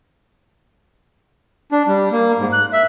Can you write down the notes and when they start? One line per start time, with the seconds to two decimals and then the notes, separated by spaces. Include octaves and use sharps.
1.72 D4
1.88 G3
2.12 A#3
2.39 G#2
2.53 F#6
2.73 E5